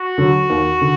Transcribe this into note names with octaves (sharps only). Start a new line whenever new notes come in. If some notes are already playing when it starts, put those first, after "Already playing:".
Already playing: F#4
D3 F#3
D#2
D3